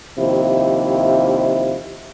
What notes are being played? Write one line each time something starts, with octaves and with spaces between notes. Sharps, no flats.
D#2 C3 F3 E4